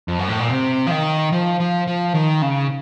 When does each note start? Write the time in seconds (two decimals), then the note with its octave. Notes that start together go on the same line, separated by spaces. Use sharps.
0.08 F2
0.19 F#2
0.29 A2
0.40 A#2
0.50 C3
0.87 F3
0.91 D#3
1.32 F3
1.60 F3
1.87 F3
2.14 D#3
2.42 C#3